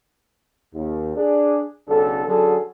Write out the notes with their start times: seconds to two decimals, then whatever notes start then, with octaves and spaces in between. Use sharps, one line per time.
0.75 D#2
1.16 D4 G#4
1.88 B1 C#3 D4 A4
2.27 D3 F#3 C#4 F#4 G#4 A4